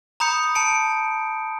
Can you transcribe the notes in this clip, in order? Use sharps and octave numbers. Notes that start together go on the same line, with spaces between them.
A#5 B5 D#6 G6 C#7
A5 C#7 D7